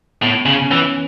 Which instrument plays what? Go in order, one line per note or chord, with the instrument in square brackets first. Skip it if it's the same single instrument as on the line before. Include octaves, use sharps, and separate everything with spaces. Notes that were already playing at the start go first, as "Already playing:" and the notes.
[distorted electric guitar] A2 [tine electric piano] B3
[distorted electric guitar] C#3 [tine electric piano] C#4
[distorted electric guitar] E3 [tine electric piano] C#4